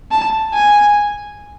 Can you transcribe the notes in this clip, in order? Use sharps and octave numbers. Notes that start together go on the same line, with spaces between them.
A5
G#5